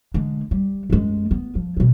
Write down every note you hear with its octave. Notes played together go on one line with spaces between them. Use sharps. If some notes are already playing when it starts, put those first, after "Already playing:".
D3 G#3
G3
F#2 G#3
B3
F3
B2 C4